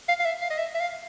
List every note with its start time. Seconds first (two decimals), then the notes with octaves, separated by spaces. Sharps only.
0.08 F5
0.20 F5
0.25 E5
0.41 F5
0.50 D#5
0.58 E5
0.75 E5
0.80 F5